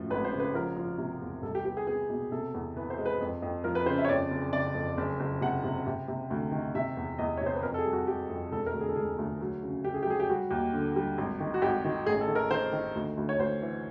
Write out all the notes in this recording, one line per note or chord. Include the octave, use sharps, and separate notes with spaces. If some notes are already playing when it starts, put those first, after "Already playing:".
Already playing: F#2 A2 F3
G#1 B4
C5
C#3
B4
F3 A#4
F3
C3
E2
C2 A4
G4
B3 G4
G#4
B3 G#4
B2
C3 A4
E2
E3 B4
C5
G#3
B4
F2
F2
F3 A#4
B4
C#3 C5
E5
C#5
F2 D5
F#1
F#1 D5
F2
F#1
F#1
C3 F#5
C3
C3
C3
D2
D#3
C3 E5
E2
E2 D#5
C#5
C3 C5
B4
F2 A#4
A4
G#4
G3
F#4
G3 G4
F2
E1 A4
A#4
D2
G#4
A4
E1 G#4
D2
F#3
C#3
C#3 G4
G#4
G4
F#3 G#4
G4
G3 F#4
D#2
D3
G3
G#1
D#3
F#4
G#1 G4
D#3
A1 G#4
A4
D#3
A#4
D#3 C5
D#3
D2
D2
C#5
D2 C5
E3